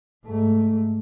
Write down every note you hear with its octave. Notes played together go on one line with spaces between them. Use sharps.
G#2 A3